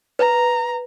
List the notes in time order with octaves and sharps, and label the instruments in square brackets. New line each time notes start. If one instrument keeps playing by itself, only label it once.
[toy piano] B4 [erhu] A#5